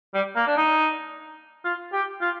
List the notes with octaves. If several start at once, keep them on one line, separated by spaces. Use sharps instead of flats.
G3
A#3
D4
D#4
F4
G4
F4